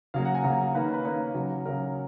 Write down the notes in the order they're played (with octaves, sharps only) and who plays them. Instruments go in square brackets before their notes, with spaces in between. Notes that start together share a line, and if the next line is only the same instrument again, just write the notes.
[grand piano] C#3 F#3 A#3 F5
F#5
G#5
C#3 F#3 A#3 A#5
D#3 A#3 C#4 B4
B4
D#3 A#3 C#4 C#5
C#3 F#3 C#4
C#3 F#3 C#4 A#4